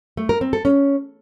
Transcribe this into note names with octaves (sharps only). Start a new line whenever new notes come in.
A3
A#4
C4
A4
C#4